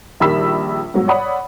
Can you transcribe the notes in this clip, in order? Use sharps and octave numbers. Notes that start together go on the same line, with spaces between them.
A#1 D#3 G3 B5 E6 B6
G#2 B2 F#3
C#5 D5 F#5 B5 D#6